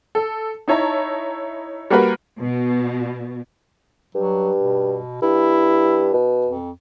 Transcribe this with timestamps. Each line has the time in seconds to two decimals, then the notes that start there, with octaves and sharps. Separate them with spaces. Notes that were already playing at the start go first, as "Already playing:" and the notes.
0.15 A4
0.68 D#4 E4 C#5 A5 A#5
1.90 G3 A#3 F#4 A#4 B4
2.40 B2
4.15 G2 F#3
4.57 B2
5.22 G2 E4
6.14 B2
6.46 F2